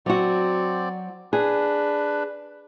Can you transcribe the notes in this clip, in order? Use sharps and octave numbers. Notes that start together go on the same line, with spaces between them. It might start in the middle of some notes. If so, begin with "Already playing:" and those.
F#3 C4 F#4 D5
D4 G#4 B4